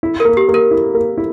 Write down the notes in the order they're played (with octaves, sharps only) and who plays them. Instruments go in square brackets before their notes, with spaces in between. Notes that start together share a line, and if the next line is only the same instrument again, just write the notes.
[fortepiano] E4
[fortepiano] A#3 [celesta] A#4
[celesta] G4
[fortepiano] A#3
[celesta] A#4
[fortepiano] E4
A#3
E4